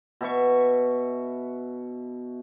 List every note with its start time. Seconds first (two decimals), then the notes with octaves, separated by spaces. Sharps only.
0.21 B2 E5 C#6